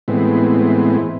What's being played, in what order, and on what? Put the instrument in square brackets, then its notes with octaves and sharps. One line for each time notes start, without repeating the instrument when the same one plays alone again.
[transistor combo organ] A2 E3 G#3 B3 C4